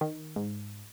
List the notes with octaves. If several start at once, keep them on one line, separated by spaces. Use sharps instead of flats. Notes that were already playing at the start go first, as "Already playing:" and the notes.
D#3
G#2